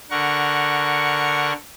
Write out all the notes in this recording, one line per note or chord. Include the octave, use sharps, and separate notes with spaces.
D3 A#4 F#5 C#6